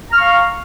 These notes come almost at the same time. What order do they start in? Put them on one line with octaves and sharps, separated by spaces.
A#5 F6 C#6 F5